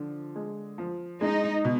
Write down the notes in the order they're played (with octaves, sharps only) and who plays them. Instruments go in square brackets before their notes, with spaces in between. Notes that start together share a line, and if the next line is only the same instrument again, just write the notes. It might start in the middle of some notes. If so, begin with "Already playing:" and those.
Already playing: [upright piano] D3 F3
G#3
F3
[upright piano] G#3 [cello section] D#4
[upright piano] B2